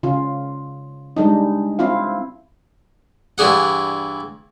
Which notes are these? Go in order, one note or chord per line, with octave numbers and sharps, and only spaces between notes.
C#3 F4
G3 G#3 D4 D#4
C4 E4 F4 F5
G2 E3 D4 G#4 F#5